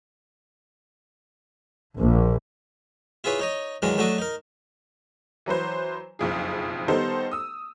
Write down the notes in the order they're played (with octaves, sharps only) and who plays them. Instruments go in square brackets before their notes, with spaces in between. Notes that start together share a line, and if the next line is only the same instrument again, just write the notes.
[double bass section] A#1
[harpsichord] E4 F4 G#4 B4 C#5
D#4 C#5 D#5
D#3 E3 F#3 G#3 D4 A#4
F#3 A3 D4 F#4 A4 D#5
D#4 A#4
[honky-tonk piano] E3 F#3 B4 C5
F#1 B1 F2 G#4
D#3 G3 B3 D#4 A4 C5
D#6 E6